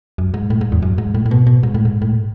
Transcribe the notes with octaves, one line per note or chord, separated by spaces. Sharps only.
F#2
G#2
A2
G#2
E2
F#2
G#2
A2
A2
B2
B2
G#2
A2
G#2
A2